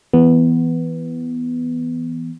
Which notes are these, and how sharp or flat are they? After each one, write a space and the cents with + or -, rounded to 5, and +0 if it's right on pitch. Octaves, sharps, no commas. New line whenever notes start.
E3 +0 B3 +0